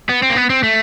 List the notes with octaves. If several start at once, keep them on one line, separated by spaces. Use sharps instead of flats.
B3
C4
A#3
B3
C4
A3